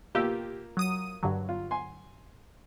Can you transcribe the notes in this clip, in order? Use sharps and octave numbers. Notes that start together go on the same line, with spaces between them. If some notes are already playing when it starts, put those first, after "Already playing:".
B2 A#3 F4 G4 E6
F#3 D#6 D#7
G2 D3 F#3
F4
G#5 C6